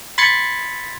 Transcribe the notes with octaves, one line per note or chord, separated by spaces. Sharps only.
B5 C6 G#6 A6 C7 C#7